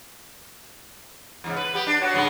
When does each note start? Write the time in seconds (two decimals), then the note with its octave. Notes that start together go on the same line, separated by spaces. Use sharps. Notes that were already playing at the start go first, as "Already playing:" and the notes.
1.44 E2 G#2 C#3
1.56 B4
1.74 B3 G4
1.87 D4
2.01 B3 F#4 C#5
2.14 G2 C#3 B3